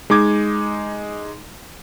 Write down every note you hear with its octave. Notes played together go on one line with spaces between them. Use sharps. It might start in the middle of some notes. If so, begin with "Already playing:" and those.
G#3 D#4 D6 G#6